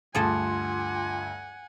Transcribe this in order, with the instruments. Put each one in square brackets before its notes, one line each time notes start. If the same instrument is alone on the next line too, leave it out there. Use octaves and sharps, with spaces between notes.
[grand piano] D2 G2 [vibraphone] F4 C6 [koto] G#4 A4 [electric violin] F#5 G#5